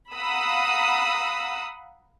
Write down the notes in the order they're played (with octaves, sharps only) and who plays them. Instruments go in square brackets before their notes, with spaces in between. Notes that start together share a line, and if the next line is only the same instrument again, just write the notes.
[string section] F5 F#5 A#5 B5 D#6 E6